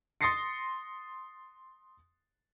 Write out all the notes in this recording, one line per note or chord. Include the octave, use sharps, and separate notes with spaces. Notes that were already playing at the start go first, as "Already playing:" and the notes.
C6 D#6 A6 A#6 C7 C#7